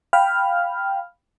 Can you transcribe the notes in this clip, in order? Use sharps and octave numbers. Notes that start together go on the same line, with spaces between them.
F5 G5 B5 F6